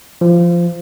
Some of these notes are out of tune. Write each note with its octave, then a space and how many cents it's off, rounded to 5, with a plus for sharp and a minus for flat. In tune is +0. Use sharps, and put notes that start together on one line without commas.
F3 -15